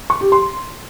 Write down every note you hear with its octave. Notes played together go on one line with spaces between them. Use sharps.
C#6
G4
C6